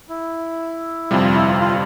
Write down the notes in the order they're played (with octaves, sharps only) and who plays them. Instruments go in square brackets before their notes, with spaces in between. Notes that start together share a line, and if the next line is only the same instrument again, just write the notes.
[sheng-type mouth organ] E4
[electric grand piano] G1 F2 C3 G3 [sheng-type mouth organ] F4
[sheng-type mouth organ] F4
E4
F4
F4